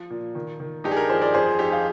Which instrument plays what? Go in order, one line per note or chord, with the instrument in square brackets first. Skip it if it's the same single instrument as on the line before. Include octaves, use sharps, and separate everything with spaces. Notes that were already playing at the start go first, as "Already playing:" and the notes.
Already playing: [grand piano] F3
A#2
D#3
D#3
G2 D#4 G4
G#4
G4 A#4
F3 G#4 C5
A#4 D5
F2 G#4 C5
F2 D#4 G4
F4 G#4